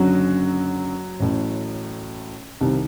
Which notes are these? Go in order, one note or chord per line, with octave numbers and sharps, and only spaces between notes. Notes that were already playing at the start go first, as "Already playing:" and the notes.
Already playing: F#1 F#2 D3 F#3 F#4
A1 A2
C2 C3 D#3